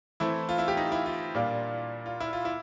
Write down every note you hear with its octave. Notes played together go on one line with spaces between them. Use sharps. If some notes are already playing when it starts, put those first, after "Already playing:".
E3 A3 C4 E4
F4
E4
G4
D#4
E4
F4
A#2 G3 A#3 D4
F4
E4
F4
E4